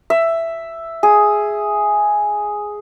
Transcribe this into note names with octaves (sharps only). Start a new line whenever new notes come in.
E5
G#4